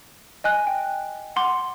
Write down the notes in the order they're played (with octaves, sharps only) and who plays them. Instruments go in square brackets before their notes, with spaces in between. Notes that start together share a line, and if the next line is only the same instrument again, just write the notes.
[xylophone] D#5 G#5 F#6
G5
F#5 C6 D6